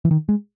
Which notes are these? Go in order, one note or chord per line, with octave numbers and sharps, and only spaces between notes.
E3
D#3
G#3